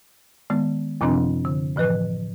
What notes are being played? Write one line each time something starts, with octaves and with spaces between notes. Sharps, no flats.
D#3 G#3 B3
F#2 C3 F3 C4 D4
D3
A2 E3 F3 B4 F#6